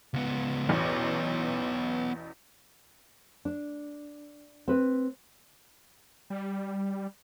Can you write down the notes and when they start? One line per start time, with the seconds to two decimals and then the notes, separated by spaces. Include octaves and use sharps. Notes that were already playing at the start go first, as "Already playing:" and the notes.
0.14 C#2 B3
0.69 A1 E2 B2 B3 C#5
3.45 D4
4.68 C4 B4
6.30 G3